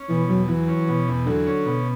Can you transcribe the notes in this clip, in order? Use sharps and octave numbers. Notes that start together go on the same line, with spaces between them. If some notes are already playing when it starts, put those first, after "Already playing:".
Already playing: C#4
B2 E3
E2 F#3
E3 F#3
C#4
B2
E2
D3 F#3
C#4
B2